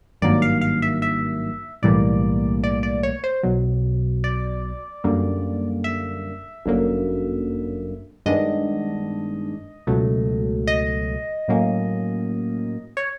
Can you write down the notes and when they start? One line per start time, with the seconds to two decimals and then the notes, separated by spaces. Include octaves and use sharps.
0.22 G#1 G2 D#3 F#3 A#3 D5
0.42 F5
0.61 F5
0.82 E5
1.02 E5
1.82 B1 A2 E3 G3 A#3 D5
2.64 D5
2.83 D5
3.03 C#5
3.24 C5
3.43 B1 B2 F#3
4.24 D5
5.04 F#2 D3 G3 A#3
5.84 E5
6.66 G1 F#2 D3 F#3 A#3
8.26 G2 D#3 G#3 B3 D4 D#5
9.87 C#2 B2 F#3 A3
10.67 D#5
11.48 A2 F#3 A#3 C#4
12.97 C#5